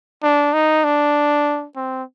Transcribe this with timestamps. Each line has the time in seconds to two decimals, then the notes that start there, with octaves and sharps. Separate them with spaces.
0.23 D4
0.53 D#4
0.84 D4
1.76 C4